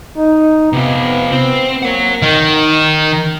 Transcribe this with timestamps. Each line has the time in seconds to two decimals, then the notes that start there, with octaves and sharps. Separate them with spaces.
0.17 D#4
0.73 C3 B3 F4
1.32 C4
1.83 A#3 C#5 F#5
2.23 D#3